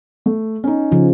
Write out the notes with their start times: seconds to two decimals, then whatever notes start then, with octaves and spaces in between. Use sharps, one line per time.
0.26 A3
0.64 C#4 D#4
0.92 C#3 F3